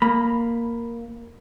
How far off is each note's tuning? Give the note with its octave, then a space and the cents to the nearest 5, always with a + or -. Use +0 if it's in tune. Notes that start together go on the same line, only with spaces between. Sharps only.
A#3 +0 B5 +0